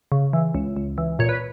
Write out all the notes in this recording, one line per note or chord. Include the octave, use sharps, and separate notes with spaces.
C#3
E3
C#2
C#2
E3
A#2 C#5
B4